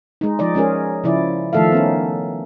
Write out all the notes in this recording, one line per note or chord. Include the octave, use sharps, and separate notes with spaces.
G#3 D#4
F3 D#4 D5 D#5
G#3 C#4 G#4 A#4
C#3 F3 E4 D5
D#3 F3 A3 A4 E5 F5
B3 C#4 D#4